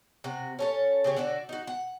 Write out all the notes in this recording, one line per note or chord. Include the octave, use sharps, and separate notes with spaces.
C3 F#4
C#4 A4 C#5
C#3 G4 C#5
D3 F#4 A4 D5
D#4 F#4
F#5